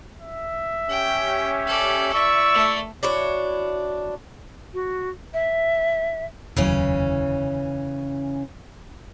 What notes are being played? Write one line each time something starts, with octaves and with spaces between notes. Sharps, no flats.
E5
C#4 G4 G5
A4 D5
E4 D5 E5 C#6 E6
A3
D4 E4 F#4 C#5
F#4
E5
F1 D#2 C#3 E3 F#3 C#4